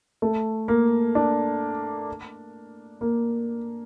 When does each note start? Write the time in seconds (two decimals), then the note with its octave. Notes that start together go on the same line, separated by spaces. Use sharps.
0.22 A3
0.68 A#3
1.15 D4
3.01 A#3